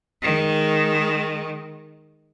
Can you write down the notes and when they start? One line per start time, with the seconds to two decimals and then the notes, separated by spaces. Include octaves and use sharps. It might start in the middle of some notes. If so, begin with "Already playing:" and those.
0.22 D#3 G#3